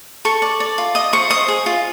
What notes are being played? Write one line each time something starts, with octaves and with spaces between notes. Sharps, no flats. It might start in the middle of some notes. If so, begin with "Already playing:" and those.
A4 C#6
D5
D5
F4
D#5 D#6
C5 C#6
C5 D#6
G#4
F4